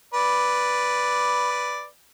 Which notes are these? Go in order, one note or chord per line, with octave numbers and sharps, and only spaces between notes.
B4 D5